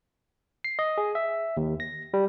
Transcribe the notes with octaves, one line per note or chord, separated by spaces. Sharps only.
C7
D#5
G#4
E5
D#2
A#6
G3